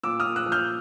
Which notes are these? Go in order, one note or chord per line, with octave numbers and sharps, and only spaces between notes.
A#2 D6 E6
D#6 F6
A#2
E6 F#6
F3
F6 G6